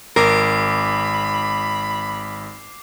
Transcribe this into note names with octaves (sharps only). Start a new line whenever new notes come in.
G#1 A#4 B5 D6 C7